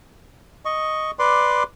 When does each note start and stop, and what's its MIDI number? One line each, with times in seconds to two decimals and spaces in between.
0.65 1.11 75
0.65 1.11 85
1.19 1.63 71
1.19 1.63 74
1.19 1.63 84
1.19 1.63 86